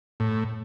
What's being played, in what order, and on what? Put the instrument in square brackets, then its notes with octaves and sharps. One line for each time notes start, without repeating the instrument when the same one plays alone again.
[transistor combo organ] A2